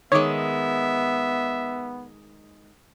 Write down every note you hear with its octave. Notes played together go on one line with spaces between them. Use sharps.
D#3 G#3 B3 C#5 E5 D6